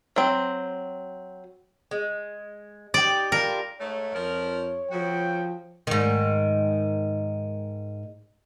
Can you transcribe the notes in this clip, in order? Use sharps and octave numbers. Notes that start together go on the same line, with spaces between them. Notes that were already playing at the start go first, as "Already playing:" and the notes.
F#3 C4
G#3
D#4 G4 D5
G3 D4 F4 A#4
G#2 A3 C#5
F2 F3 A#4
F2 C#3 F3 F#4 G5
G#2 D#3